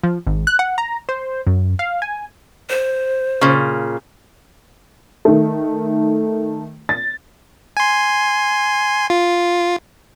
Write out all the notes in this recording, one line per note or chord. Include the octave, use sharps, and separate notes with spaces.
F3
G#1
F#6
F#5
A#5
C5
F#2
F5
G#5
C5
A#2 C#3
D#3 A3
A6
G#5 C6
F4